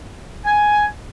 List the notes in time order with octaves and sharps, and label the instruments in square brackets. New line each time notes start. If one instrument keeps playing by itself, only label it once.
[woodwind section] G#5